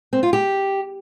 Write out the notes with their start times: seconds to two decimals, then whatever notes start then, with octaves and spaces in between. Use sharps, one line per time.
0.13 C4
0.23 F4
0.33 G4